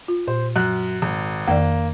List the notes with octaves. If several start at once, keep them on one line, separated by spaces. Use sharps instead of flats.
F4
A#2 C5
F#2 F#6
G#1
F2 D#3 A#3 D5